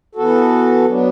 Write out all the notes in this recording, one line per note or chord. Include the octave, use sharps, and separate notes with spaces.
E3 B3 F#4 A4
F#3 B3 D4